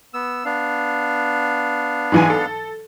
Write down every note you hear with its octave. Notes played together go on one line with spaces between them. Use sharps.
B3 E6
B3 D4 F5
G#2 E3 G#5
A4